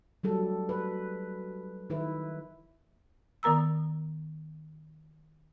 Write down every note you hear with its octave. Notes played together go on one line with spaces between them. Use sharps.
F#3 G3 A4
B4
D#3 E4 B4
D#3 B3 A#4 A#5 E6